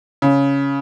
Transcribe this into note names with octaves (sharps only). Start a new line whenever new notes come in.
C#3